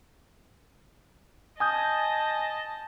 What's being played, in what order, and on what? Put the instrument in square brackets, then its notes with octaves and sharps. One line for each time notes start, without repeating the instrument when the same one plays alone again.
[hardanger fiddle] D#5 A5 [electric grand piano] G#5 D#6 G6